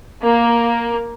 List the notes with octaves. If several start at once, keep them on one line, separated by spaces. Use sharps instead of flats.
A#3